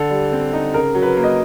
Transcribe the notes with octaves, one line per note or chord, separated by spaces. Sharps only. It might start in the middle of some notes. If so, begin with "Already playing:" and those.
Already playing: D3 A4
G3
C4
D#4
C#3 A#4
F#3
B4
A#3
D#5